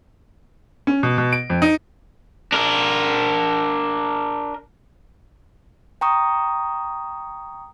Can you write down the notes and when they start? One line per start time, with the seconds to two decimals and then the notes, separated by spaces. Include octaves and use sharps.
0.87 C#4
1.03 B2
1.18 B2
1.33 D7
1.50 F2
1.62 D#4
2.52 D4 A#4
6.01 G5 A#5 C#6 D#6